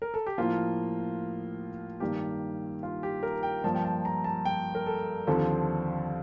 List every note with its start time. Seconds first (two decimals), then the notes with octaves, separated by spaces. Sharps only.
0.02 A#4
0.14 A4
0.27 G4
0.38 A2 F3 A#3 F4
2.00 G2 D#3 A#3 G4
2.83 F4
3.03 G4
3.23 A#4
3.43 G5
3.64 G2 F3 A#3 A5
3.75 G5
3.85 A5
4.05 A#5
4.24 A5
4.45 G5
4.75 A#4
4.86 A4
5.27 D#2 D3 F3 C4 A4